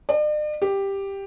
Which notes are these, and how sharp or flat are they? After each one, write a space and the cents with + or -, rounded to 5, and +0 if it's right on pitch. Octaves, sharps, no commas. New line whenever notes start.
D5 +45
G4 +5